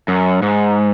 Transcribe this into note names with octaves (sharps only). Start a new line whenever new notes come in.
F#2
G#2